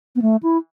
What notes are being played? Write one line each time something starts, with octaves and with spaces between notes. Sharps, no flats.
B3
A3
E4